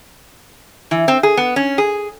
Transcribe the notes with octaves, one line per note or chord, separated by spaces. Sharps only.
E3
C4
G#4
B3
C#4
G#4